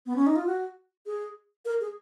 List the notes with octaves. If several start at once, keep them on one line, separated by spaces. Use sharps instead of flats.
B3
C#4
D#4
F4
F#4
G#4
A#4
G#4